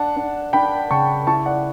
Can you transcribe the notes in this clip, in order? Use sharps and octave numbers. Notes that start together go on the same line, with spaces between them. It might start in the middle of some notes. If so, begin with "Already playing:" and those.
Already playing: D4 F#5 A5
D4
D4 G5 B5
C#3 A5 C#6
E4 A5 C#6
D5 F#5